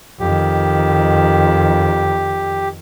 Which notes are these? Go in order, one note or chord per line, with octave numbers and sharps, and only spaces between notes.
F2 D#3 G4